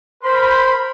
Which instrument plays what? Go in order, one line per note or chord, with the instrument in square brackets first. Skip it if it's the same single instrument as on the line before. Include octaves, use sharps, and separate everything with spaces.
[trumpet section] A#4 B5 [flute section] C5 C6